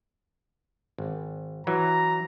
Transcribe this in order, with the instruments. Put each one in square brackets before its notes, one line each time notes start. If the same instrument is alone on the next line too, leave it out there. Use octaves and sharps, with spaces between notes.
[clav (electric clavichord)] G#1
[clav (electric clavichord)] E3 F#3 [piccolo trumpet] A#5